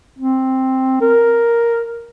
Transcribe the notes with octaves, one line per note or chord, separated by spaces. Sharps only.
C4
A#4